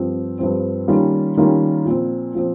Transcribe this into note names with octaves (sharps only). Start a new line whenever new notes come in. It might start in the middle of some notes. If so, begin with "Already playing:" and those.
Already playing: G2 F3 C4
G2 F3 C4
D#3 G3 A#3 C#4 F4
D#3 G3 A#3 C#4 F4
A#2 F3 C4
A#2 F3 C4